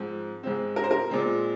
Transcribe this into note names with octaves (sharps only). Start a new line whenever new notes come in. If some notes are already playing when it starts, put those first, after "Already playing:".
Already playing: G#2 F3 C4
G#2 G#3 C4
A#4
C5
A#4
A#2 G#3 C4